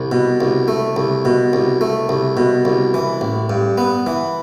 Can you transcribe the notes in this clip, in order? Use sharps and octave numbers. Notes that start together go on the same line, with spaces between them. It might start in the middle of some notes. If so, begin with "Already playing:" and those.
Already playing: C2
B2
C2
A3
C2
B2
C2
A3
C2
B2
C2
E3
A1
G2
B3
E3